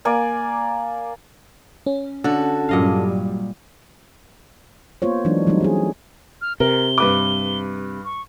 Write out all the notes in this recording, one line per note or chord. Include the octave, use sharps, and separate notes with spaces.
A#3 D5 G#5
C#4
D3 F#4 A4
G2 A#2 F#3 G3 D#5 F5
A#3 B3 F4 C5 C#5
E3 F#3 G#3 D4 D#4
E3 F#3 G3 A3 C4 D#4
C#4 D#4 G#4
F6
C3 A#4 G7
G2 B4 D6
C#6